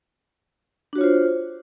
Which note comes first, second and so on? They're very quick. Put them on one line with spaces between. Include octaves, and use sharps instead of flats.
D4 F#4 C#5 F4 C5